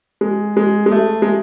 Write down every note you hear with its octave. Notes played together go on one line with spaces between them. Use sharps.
G#3
G#3
G#3
A3
G#3